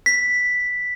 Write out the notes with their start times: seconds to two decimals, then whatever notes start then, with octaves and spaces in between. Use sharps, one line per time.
0.06 B6